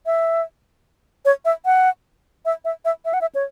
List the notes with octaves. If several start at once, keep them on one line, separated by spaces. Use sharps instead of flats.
E5
C#5
E5
F#5
E5
E5
E5
E5
F#5
E5
C#5